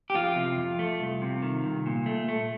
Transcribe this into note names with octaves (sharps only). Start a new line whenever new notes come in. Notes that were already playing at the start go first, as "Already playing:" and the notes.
G4
F2 F4
C3
F2
A3
C2
C3
D#3
C2
A#2
A3
A3